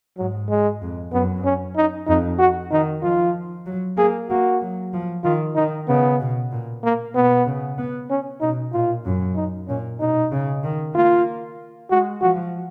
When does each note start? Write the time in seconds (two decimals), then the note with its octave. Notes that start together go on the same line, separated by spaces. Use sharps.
0.18 G#2 F#3
0.49 G#3
0.82 F2
1.13 F#2 B3
1.45 C#4
1.76 D#4
2.07 F2 D#4
2.39 F#4
2.72 D#3 D#4
3.03 F3 F4
3.66 F#3
3.97 A#3 G#4
4.30 A#3 F#4
4.61 F#3
4.94 F3
5.24 D#3 F4
5.56 D#3 D#4
5.89 C#3 B3
6.20 B2
6.52 A#2
6.84 A#3
7.15 B2 B3
7.46 C#3
7.78 B3
8.10 C#4
8.41 B2 D#4
8.73 A#2 F4
9.05 F#2
9.36 D#4
9.68 A#2 C#4
10.00 B2 D#4
10.32 C#3
10.64 D#3
10.95 A#3 F4
11.90 G#3 F#4
12.22 F3 F#4